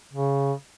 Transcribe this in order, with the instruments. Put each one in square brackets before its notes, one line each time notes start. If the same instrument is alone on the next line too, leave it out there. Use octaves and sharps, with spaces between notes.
[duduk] C#3